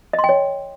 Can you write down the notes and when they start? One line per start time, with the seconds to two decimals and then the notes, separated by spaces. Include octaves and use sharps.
0.13 D#5
0.19 C6
0.24 G5
0.29 C#5